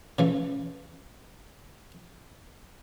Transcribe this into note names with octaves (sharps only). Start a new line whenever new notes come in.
C#3 E3 A3